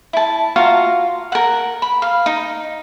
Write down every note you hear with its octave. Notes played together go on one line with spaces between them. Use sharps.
E4 A5
F4 F#4 F5 A#5
A#4 F#5
B5
F5
D#4